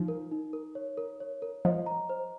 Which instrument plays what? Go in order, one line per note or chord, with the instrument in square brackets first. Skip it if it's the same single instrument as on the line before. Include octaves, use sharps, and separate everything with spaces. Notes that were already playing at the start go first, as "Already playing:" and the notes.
Already playing: [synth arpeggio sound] F3 [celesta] D#4
[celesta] A#4
D#4
A#4
C#5
A#4
C#5
A#4
[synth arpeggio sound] F3 [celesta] D#5
[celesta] A#5
C5